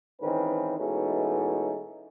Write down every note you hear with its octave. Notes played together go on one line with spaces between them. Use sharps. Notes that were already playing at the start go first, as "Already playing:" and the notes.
G#2 D#3 E3 C4 C#4 B4
B2 E3 G#3 A3 C#4 D#4